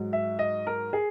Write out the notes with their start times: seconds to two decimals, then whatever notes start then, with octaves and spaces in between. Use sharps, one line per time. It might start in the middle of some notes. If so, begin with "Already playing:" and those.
Already playing: G#2 F#3
0.13 E5
0.39 D#5
0.67 A#4
0.93 G#4